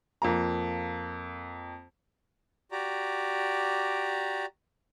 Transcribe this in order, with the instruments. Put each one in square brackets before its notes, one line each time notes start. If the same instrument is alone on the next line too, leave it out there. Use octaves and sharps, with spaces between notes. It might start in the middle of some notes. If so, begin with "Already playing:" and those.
[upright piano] F2 A#3 A#5
[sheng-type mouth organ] F#4 G4 D5 A#5